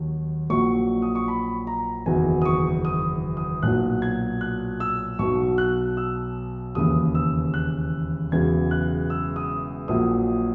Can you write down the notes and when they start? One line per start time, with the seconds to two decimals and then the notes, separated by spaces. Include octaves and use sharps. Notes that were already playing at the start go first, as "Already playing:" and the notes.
Already playing: D#2 D#3 F#3
0.50 A#1 A#2 F#3 C#6
1.02 D#6
1.15 C#6
1.28 B5
1.67 A#5
2.06 F#1 E2 D#3 F#3 G#5
2.42 D#6
2.45 C#6
2.85 D#6
3.37 D#6
3.63 B1 A#2 F#3 F#6
4.02 G#6
4.41 F#6
4.80 E6
5.19 B1 B2 F#3 C#6
5.58 F#6
5.97 E6
6.75 E1 D#2 C#3 E3 D#6
7.15 E6
7.54 F#6
8.32 E1 E2 C#3 F#3 G#6
8.71 F#6
9.10 E6
9.36 D#6
9.88 A#1 A#2 F#3 D#6